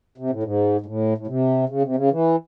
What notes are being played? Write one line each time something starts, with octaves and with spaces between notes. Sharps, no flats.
C3
A2
G#2
G#2
A2
A2
C3
C#3
C3
C#3
E3